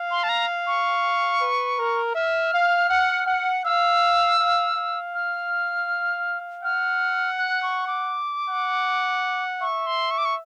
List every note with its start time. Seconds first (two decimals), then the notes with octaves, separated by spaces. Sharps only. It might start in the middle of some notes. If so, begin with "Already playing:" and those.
Already playing: F5
0.11 C6
0.23 A5
0.29 A#5
0.67 C#6
1.42 B4
1.79 A#4
2.15 E5 F6
2.53 F5
2.90 F#5
3.27 F#5
3.65 F5 E6
4.40 F5
4.76 F5
5.14 F6
6.64 F#5 F6
7.38 F#6
7.63 C#6
7.87 D6
8.50 F#5
9.61 E5 C#6
9.87 C6
10.11 C#6
10.18 D6
10.25 C#6